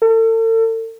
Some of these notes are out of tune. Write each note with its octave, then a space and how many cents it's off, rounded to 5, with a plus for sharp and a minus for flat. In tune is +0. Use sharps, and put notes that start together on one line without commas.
A4 +40